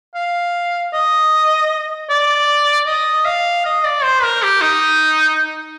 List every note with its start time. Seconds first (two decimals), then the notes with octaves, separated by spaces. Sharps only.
0.15 F5
0.93 D#5
2.10 D5
2.87 D#5
3.25 F5
3.65 D#5
3.84 D5
4.03 C5
4.23 A#4
4.43 G4
4.61 D#4